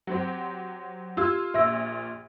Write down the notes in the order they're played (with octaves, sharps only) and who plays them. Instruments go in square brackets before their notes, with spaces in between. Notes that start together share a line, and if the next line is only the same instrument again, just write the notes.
[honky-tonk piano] F#3 C4 G4
[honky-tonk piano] F4 E6 G#6 [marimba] G4
[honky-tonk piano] A#1 A#2 A#6 [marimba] E5 E6